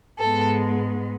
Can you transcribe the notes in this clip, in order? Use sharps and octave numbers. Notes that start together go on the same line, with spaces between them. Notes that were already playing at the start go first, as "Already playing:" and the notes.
G#2 G#3 B3 A4